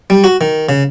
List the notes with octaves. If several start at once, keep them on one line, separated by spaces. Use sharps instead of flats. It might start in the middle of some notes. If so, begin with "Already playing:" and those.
G3
F#4
D#3
C#3